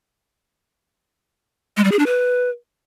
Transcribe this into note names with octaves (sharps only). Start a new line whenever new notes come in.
G#3
G3
G#4
D4
B4